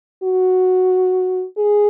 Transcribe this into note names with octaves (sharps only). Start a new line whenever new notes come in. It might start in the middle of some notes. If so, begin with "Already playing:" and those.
F#4
G#4